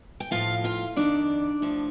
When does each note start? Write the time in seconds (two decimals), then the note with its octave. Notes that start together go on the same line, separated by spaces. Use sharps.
0.20 G5
0.31 A2 F3 F4 F5
0.64 F4 F5
0.97 F2 D#3 D4 D5
1.62 A2 F3